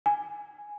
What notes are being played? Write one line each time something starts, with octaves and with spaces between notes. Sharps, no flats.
G#5